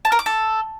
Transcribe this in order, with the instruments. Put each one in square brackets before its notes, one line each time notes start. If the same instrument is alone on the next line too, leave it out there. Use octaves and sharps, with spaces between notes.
[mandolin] A5
A#4
D6
A4